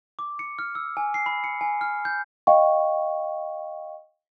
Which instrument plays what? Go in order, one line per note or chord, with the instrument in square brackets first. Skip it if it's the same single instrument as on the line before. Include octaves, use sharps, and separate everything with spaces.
[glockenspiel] D6
C#7
F6
E6
G#5
C7
B5
C#7
G#5
F6
G6
[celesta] D#5 F5 G5 C#6